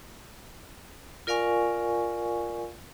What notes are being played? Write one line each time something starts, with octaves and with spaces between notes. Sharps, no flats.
F4 A#4 D5 F5 G#5 C#6